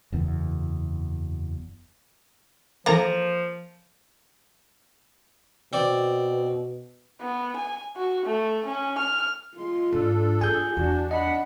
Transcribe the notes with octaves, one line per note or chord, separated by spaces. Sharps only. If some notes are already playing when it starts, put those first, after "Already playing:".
F#1 E2
E3 F3 A#3 A4 A#4 A#5 A#6
B2 C4 D5
B3
G#5
F#4
A3
C#4
F6
G#3 F4 C6
G#2 D4 A4
F4 G#4 G#5 G6
E2 D4 F#4
D#5 F#5 B5